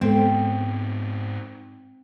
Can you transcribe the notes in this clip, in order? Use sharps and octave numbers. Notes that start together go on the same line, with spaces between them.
G#2 G#3 B3 C4 A4